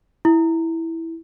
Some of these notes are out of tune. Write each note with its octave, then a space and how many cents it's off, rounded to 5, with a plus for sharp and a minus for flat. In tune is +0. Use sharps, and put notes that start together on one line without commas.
E4 -5